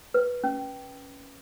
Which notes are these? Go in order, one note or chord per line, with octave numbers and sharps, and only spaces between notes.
B4
C#4